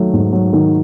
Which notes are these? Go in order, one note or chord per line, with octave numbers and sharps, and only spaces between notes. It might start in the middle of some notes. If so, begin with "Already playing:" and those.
Already playing: D#3 F#3 A3
G#2
F#3
D#3